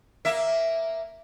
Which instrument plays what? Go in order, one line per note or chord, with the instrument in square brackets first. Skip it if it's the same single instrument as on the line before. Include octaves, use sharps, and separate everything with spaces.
[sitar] A#3 E5